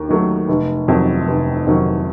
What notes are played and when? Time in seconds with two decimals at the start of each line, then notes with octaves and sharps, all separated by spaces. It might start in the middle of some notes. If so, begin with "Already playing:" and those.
Already playing: D#2
0.09 D#3 F#3 A3
0.48 F1
0.88 F2 C3 D#3 F#3
1.28 F1
1.67 F2 C3 D#3 F#3